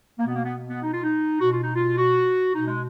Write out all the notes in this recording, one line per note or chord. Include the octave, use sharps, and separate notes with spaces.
A#3
B2 B3
A#3
B3
B3
D#4
F4
D#4
B2 F#4
F4
D#4
F4
F#4
B2 D#4
G#3